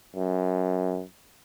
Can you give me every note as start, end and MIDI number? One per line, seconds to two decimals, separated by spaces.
0.16 1.03 42